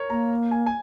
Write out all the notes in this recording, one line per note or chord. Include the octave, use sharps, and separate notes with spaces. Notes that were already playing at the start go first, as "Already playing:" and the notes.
Already playing: A#4 C#5
A#3 A#5
G#5
G#5